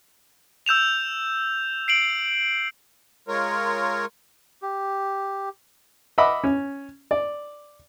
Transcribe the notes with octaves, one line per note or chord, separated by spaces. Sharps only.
E6 G6 E7 F7
C7 D7 F#7
G#3 F4 A#4 C#5
G4
D#5 E5 F#5 B5 D6
C#4
D5